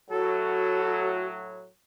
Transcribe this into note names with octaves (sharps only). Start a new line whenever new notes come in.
A2 F#3 F#4 A4